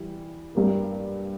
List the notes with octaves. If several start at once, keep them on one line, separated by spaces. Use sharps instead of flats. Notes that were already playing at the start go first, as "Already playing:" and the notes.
Already playing: E3 G3
G2 G3 A#3